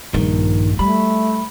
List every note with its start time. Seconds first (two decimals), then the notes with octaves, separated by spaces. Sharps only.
0.14 A#1 G2 D#3
0.79 G3 A3 B5